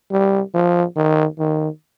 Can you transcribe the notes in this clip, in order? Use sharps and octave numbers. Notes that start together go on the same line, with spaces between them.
G3
F3
D#3
D#3